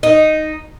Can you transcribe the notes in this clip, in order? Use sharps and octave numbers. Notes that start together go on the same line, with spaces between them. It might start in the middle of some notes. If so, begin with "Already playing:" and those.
D#4